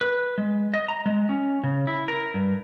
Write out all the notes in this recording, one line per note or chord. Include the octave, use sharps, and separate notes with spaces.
B4
G#3
D#5
A#5
G#3
C#4
C#3
E4
A#4
G2